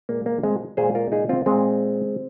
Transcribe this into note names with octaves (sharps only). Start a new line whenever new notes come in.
A#2 G#3 A#3
A#3
G#3 C4
A#2 G#3 G#4 C5
F4 A#4
D#4 G#4
C4 F4
A#2 G#3 C4